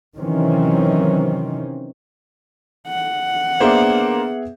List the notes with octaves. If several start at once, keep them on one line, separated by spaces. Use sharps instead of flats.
C3 D#3 E3 F#3 C4 C#4
F#5
A#3 B3 D4 G#4 C5 E5